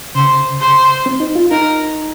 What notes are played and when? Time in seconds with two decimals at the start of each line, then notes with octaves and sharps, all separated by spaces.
0.15 C#3 C5
0.60 C5
1.06 C4
1.20 D#4
1.35 F4
1.51 D#4 A#4